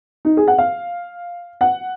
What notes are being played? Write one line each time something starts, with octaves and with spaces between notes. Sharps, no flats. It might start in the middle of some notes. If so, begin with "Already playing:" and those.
D#4
G#4
F#5
F5
F#5